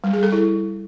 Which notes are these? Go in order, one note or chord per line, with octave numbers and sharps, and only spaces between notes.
G3
G#4
A4
E4